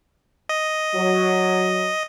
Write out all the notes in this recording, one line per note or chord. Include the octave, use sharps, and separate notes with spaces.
D#5
F#3